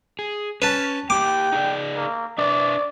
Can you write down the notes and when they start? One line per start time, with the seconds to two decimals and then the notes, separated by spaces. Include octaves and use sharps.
0.19 G#4
0.62 C#4 B4 A5
1.10 A#3 G4 G5 D6
1.52 D#4 G#4 D5
1.96 A#3
2.38 D4 B4 D5 E5